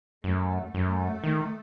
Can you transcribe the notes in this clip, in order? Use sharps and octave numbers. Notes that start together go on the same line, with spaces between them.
F#2 A3
F#2 A3
D#3